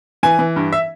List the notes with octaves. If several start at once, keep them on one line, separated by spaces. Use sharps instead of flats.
E3 G#5
E3
G2
E5